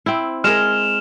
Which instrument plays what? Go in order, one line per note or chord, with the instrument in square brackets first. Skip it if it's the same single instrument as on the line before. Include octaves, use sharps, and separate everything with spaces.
[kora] C4 E4
[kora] G#3 G#4 A#4 [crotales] F6 E7 F7